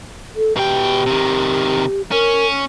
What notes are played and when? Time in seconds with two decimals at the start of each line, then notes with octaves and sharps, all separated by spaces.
0.36 A4
0.56 B2 G4 G5
1.06 C3 D#3
2.11 C#4 A#4